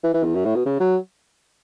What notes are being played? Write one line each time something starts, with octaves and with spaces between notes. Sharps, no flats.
E3
E3
E2
F#2
A2
B2
C#3
F#3